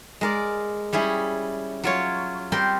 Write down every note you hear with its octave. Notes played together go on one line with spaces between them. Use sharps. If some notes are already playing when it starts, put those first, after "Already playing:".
G#3 A#4 D5
G3 C#4 E4 G#4
F#3 F4 C#5
G3 C4 A#4 C5 G5 C6